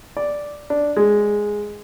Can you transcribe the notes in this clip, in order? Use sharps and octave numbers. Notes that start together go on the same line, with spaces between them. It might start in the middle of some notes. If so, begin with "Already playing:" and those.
D5
D4
G#3